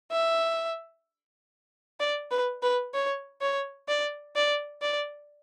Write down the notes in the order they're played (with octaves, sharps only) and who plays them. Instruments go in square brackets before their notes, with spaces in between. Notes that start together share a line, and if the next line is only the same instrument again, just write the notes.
[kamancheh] E5
D5
B4
B4
C#5
C#5
D5
D5
D5